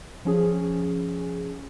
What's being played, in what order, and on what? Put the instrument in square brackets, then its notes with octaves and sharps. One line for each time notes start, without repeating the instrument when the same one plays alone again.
[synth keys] F3 C#4 G#4